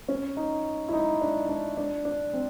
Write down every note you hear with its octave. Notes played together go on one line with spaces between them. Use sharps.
C#4
D#4
E4
D#4
D4
D4
D4
D4
C4